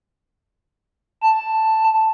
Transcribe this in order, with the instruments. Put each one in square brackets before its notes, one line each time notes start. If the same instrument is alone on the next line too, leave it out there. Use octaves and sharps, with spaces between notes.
[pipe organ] A5